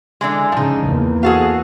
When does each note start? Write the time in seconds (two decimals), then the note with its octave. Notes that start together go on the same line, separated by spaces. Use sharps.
0.21 D3 E3 G#3
0.52 G#2 C#3 F3 D#4
0.84 E2 A#3
1.23 F#4 G#4 A4 F5